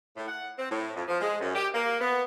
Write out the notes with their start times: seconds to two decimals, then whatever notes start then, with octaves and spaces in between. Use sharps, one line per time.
0.16 A2
0.28 F#5
0.57 C4
0.70 A2
0.96 F2
1.08 F3
1.20 G#3
1.41 F#2
1.55 G4
1.73 A#3
2.01 B3